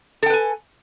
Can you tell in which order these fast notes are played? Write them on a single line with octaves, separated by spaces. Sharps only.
A4 G5 B4 G#5